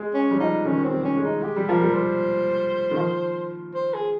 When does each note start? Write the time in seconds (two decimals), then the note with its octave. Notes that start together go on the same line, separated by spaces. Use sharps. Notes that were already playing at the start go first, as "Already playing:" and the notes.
Already playing: G#3
0.14 C#4
0.31 G3
0.39 F3 D#4
0.65 D#3 C#4
0.85 C4
0.91 G3
1.04 C#4
1.17 G#3
1.24 D#4
1.43 G#3 G4
1.56 G3
1.68 F3 A#4
1.82 G3
1.94 C5
2.91 D#3
2.97 F3
3.74 C5
3.94 G#4